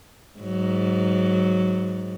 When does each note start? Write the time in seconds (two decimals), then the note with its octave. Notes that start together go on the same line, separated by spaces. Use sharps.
0.40 G#2 F#3